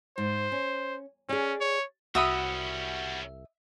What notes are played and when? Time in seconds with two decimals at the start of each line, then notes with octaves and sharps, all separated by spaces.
0.18 G#2 C5
0.52 C#4
1.29 C#4 G#4 D5
1.61 C#5
2.15 C2 G3 C#4 F#4 E5 F#5 B5 D#6